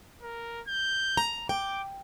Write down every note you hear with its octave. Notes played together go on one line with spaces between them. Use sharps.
A#4
G6
A#5
G5 D6